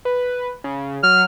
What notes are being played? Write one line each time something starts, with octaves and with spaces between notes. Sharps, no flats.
B4
C#3
F#3 F6